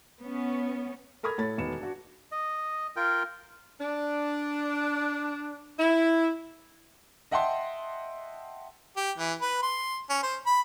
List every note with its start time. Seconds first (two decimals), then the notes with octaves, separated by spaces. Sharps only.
0.20 B3 C#4
1.23 A4 A#4 B5 D#6 F6 G#6
1.38 A2 A3 C#5 B5 A6
1.58 E1 D#3 B3 B5 C#7 E7
1.80 D4 F#4
2.32 D#5
2.96 F4 A#4 G5
3.80 D4
5.79 E4
7.31 D#5 E5 F#5 G5 A5 C6
8.97 G4
9.18 E3
9.41 B4
9.63 C6
10.10 C#4
10.23 C5
10.46 B5